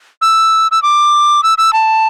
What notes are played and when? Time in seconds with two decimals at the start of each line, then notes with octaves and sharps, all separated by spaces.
0.22 E6
0.71 E6
0.83 D6
1.43 E6
1.58 E6
1.73 A5